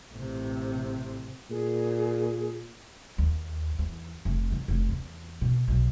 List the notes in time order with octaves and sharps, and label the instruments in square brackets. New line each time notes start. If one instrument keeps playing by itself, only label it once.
[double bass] A1 C3
[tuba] A#2 [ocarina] G#4
[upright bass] D#2
E2
F1
D#3
F1
E2
B2
B1